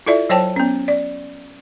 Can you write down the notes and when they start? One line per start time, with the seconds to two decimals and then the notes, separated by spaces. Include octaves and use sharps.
0.06 E4 F4 A4 D5 E5
0.30 F#3 C5 C#5 G5 A5
0.56 B3 C#4
0.88 D5